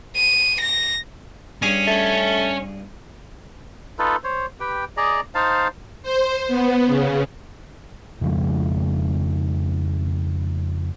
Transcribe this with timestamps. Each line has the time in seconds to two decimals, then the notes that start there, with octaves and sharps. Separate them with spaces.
0.16 D#7
0.61 A#6
1.62 G2 C#4 G#4
1.87 A3
3.99 D#4 F4 A4 B4
4.24 C5 C#5
4.60 G4 B4 G5
4.97 G#4 D5 D#5 A#5
5.35 D#4 C5 F5 A5
6.03 C5
6.48 B3
6.86 C#3
8.21 F2 C#3 F3 G#3